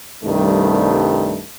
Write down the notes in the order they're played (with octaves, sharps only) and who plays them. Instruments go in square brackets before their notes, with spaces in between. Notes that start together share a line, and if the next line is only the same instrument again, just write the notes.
[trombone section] C2 G2 D#3 A3